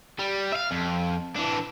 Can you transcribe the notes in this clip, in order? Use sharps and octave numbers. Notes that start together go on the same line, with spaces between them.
G3
E5 F5
F2
E3 D4